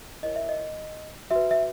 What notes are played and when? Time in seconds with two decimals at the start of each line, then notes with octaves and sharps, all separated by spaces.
0.23 E4 A#4 C#5 D#5
0.36 E5
0.49 D#5
1.31 F#4 B4 E5
1.51 E5